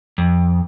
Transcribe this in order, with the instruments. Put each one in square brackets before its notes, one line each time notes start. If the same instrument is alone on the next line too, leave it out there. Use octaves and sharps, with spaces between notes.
[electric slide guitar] F2